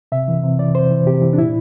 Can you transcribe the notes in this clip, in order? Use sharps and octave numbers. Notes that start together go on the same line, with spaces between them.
C3 E5
E3
C3
E3 D5
C3 C5
E3
C3 G4
E3
D4
A#2 E4